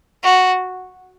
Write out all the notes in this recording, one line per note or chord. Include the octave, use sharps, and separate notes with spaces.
F#4